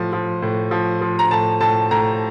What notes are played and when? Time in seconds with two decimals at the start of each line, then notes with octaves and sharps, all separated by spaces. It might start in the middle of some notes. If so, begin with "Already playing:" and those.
Already playing: A2 F3
0.13 F3
0.42 A2
0.71 F3
1.01 F3
1.19 A#5
1.31 A2 A5
1.61 A2 A5
1.91 A2 A#5